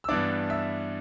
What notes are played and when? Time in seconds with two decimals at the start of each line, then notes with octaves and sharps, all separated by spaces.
0.04 E6
0.08 G2 E3 B3 D4 D5 D6
0.50 E5 E6